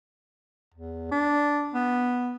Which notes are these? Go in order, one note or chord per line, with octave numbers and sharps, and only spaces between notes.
E2
D4
B3